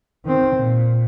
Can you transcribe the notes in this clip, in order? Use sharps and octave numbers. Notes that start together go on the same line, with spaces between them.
D#3 C4
A#2